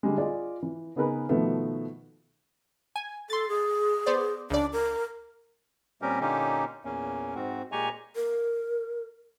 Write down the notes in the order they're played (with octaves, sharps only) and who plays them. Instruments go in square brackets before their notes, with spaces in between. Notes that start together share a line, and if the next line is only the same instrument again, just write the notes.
[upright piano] D3 G3 G#3
F4 G#4 D5 D#5
E3
C#3 B3 D#4 G#4 A#4 B4
B2 D#3 F3 A3 B3
[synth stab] G#5
[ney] A4 [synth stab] C6 A6
[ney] G#4
[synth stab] B3 C5 D5
[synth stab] C#2 D5 [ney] D4
[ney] A#4
[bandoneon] A#2 G3 C4 C#4 G4 A#4
A#2 D3 A#3 C#4 D#4 G4
E2 A#2 A#3 C#4
G#2 C4 F#4
A#2 G#3 G4 G#5 A#5 C#6
[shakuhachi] A#4